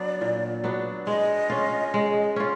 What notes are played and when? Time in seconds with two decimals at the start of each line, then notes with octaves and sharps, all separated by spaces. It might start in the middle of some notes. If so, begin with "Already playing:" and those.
Already playing: F#3 B3 D4 D5
0.21 A#2
0.64 F#3 B3 D4
1.07 G#3 D#5
1.50 C#4 F4
1.94 G#3
2.36 C#4 F4